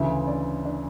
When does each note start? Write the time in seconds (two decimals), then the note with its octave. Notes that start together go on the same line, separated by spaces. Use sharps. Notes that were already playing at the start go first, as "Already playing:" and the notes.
Already playing: D2 C#3 E3 E4 E5
0.28 D4 D5
0.65 D4 D5